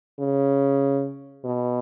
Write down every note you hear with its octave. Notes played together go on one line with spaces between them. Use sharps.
C#3
B2